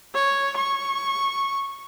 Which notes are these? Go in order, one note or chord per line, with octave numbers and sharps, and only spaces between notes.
C#5
C#6